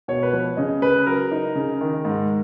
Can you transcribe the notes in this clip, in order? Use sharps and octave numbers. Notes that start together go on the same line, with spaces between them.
B2 C#5
B4
F3 C#5
C#3 D#5
C#3 B4
F#3 A#4
D#4
C#3
D#3
G#2